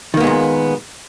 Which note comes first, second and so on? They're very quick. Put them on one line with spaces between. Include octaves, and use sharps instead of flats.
D#3 A#3 B3 G#3 A#2